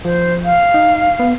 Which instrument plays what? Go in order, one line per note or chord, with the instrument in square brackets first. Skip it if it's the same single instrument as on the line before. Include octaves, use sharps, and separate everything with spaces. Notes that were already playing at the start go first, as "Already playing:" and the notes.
[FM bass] F3 [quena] C5
[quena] F5
[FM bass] D#4
B3